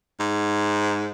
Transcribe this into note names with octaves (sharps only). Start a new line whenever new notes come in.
G#2